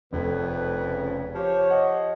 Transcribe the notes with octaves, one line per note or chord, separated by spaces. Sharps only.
F1 F2 C#3 A3 B4
C#3
F3 G4 C#5
D#5 F#5